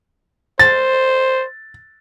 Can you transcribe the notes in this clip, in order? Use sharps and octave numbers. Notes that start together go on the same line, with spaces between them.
C5 A6